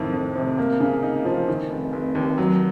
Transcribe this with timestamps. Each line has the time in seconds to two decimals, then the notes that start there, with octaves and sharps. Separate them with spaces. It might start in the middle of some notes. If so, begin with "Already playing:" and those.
Already playing: F2 A2 D#3
0.13 F2
0.35 C3
0.58 A#3
0.80 C#3
1.03 D#4
1.25 F3
1.48 D#3
1.70 F1
1.93 F1
2.15 D#2
2.38 F#3